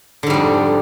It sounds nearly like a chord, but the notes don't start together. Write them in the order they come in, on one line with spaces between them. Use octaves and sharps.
D3 G#2 G3 F2